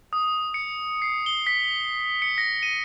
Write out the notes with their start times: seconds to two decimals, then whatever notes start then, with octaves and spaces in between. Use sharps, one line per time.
0.13 D#6
0.54 C#7
1.02 C7
1.26 G7
1.47 B6
2.22 C#7
2.38 A#6
2.63 D#7